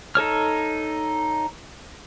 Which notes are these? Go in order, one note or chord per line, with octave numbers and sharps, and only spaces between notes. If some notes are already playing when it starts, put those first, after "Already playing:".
D#4 A4 C#5 F6